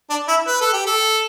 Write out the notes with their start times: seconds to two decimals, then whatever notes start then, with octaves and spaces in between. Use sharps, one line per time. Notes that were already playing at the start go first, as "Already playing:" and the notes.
0.10 D4
0.28 E4
0.47 B4
0.61 A4
0.73 G4
0.86 A4